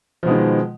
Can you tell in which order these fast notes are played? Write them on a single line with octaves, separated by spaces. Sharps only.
F3 B2 G#3 D#3